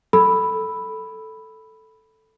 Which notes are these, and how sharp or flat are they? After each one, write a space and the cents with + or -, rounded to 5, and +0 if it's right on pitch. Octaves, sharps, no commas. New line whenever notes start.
A4 +0 B5 +0 E6 +0